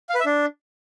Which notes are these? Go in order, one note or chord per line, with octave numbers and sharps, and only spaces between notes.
F5
B4
E5
D4